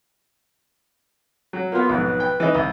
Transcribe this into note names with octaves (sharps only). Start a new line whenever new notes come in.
F#3
A#3 B3 F4
B1 F2 G#2 B4
G5
E3 D#4
C2